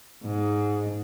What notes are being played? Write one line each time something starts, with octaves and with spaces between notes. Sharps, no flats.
G#2